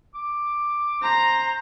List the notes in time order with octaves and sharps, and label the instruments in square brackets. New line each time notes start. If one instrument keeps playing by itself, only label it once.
[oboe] D6
[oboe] C5 [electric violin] A#5